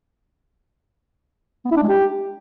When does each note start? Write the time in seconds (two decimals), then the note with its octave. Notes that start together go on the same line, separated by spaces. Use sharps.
1.65 B3
1.71 E4
1.77 D4
1.83 G#3
1.89 G4